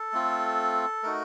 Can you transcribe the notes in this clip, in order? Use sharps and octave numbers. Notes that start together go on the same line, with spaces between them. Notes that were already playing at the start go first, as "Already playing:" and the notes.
Already playing: A4
A3 C4 F4
A3 D#4 F#4 A#4